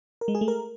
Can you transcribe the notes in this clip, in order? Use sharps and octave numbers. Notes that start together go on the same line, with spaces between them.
A#4
G#3
G#4
A3
A#4